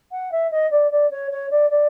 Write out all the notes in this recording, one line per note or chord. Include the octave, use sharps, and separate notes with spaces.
F#5
E5
D#5
D5
D5
C#5
C#5
D5
D5